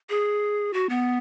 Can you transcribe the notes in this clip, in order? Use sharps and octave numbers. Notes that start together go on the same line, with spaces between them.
G#4
F#4
B3